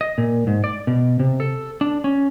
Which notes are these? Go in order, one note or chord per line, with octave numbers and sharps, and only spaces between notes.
D#5
A#2
G#2
D5
B2
C3
A4
D4
C#4